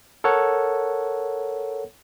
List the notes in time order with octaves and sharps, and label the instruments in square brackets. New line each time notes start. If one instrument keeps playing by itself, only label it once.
[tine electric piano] A4 A#4 C#5 F#5